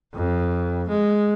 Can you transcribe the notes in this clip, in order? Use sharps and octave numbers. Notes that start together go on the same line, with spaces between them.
F2
G#3